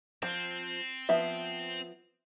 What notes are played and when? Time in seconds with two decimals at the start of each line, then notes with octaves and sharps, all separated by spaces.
0.23 F3 C4
1.09 F3 B3 E5